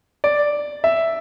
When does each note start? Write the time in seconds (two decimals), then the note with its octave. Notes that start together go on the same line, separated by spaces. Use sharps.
0.24 D5
0.84 E5